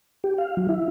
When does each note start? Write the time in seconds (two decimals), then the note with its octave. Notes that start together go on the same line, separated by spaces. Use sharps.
0.24 G4
0.38 F5
0.57 F#3
0.69 E4